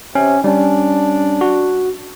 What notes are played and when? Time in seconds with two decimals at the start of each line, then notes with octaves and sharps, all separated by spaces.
0.15 C3 C#4
0.44 G3 C#4 D4
1.41 F#4